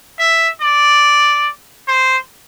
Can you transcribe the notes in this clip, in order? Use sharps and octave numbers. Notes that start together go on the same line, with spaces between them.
E5
D5
C5